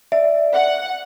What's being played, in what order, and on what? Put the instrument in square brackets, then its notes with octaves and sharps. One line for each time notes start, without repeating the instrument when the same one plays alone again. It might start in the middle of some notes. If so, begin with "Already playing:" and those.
[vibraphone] D5 [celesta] E5
[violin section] F#5